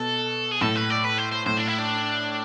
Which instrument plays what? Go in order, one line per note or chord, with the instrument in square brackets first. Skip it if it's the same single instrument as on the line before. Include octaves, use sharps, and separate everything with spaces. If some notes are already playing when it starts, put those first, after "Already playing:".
Already playing: [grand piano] B2 [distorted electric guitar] A4
[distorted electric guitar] G#4
[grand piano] A2 [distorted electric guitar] A4
[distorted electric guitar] B4
D5
B4
C5
C5
[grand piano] A2 [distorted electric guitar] C5
[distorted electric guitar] D4
E4
D4